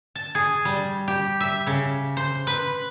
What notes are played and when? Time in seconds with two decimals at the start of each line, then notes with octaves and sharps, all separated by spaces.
0.15 A5
0.35 G#4
0.65 G3
1.08 G4
1.40 E5
1.67 C#3
2.17 C5
2.47 B4